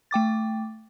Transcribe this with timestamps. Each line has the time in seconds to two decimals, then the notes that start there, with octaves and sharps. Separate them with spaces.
0.11 A3 G5 D6 A6